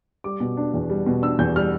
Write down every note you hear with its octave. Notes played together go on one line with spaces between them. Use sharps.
G3 D6
B2
D4
E2
G3
B2
D4 E6
E2 G6
G3 F6